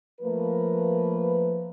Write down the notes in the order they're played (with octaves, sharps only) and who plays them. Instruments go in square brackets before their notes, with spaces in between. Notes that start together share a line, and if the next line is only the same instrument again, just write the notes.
[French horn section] F3 A3 A#3 A#4 B4